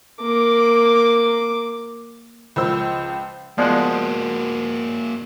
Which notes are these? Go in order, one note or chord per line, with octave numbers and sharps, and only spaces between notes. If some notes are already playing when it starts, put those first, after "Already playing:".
A#3 D6
C#2 F3 C5 E6
F3 G#3 A#3 B3 F#4 D5 F#5